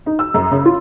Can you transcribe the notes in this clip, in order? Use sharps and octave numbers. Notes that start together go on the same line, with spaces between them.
D#4
E6
F#2
C#3
F4